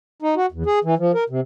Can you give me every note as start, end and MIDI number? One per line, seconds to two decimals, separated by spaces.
0.22 0.35 63
0.36 0.46 66
0.52 0.63 40
0.66 0.79 68
0.84 0.95 52
0.98 1.12 53
1.14 1.24 70
1.30 1.40 48